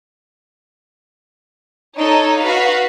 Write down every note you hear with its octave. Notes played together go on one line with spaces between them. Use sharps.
D#4 A4 C#5
F#4 B4 F5